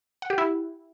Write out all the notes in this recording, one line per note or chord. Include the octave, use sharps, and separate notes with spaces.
F#5
G4
E4